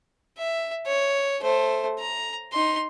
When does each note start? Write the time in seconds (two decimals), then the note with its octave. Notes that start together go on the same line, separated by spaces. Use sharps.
0.38 E5
0.87 C#5
1.41 A3 C5
1.99 A#5
2.52 D#4 C6